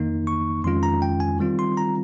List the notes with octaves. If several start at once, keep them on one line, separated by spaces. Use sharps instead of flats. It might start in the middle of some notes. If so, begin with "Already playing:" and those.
Already playing: F2 D#3 A#3 D#4
C#6
F2 D#3 G#3 C#4 F4 C6
A#5
G5
G#5
D#3 G3 C4 F4
C6
A#5